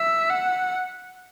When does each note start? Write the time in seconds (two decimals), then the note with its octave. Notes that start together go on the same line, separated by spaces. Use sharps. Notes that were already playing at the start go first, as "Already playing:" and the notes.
Already playing: E5
0.31 F#5